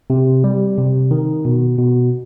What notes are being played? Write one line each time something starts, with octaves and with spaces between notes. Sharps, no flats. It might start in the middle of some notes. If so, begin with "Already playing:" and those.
C3
G3
C3
D#3
B2
B2